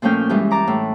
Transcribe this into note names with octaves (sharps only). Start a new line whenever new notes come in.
A#2 F3 A3 C#4 G5 F6
G2 E3 G#3
A5 A#5 D6
A2